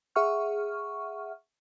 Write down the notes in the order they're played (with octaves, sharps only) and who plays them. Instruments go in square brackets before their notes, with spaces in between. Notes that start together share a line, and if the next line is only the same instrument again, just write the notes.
[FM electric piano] G#4 E5 F#5 C#6 F6